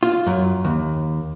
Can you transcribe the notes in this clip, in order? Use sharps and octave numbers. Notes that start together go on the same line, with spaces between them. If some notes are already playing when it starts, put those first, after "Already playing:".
F4
F#2
D#2